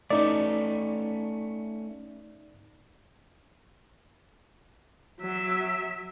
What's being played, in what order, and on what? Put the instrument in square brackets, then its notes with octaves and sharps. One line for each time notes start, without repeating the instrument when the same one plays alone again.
[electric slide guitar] A3 C#4 [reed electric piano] D#4 D5
[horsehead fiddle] F#3 E5